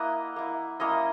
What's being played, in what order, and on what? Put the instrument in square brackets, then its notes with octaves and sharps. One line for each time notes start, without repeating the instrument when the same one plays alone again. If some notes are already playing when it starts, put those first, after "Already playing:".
Already playing: [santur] A#3 E4 D#5 F#5
A#3 E4
A#3 C#4 E4 D#5